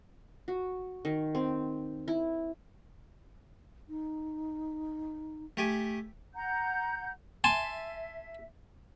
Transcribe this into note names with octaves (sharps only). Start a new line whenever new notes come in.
F#4
D#3
C4
E4
D#4
A3 G4 G#5
F#5 A#5 G6
E5 G#5 A5 C6